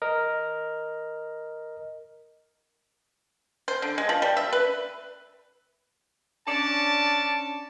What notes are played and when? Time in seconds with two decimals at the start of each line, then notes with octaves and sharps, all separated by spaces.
0.02 A#4 D#5
3.68 C5
3.82 D3
3.98 G#3
4.09 F3
4.22 G3
4.37 E5
4.52 B4
6.48 C#4 D4 D5 A5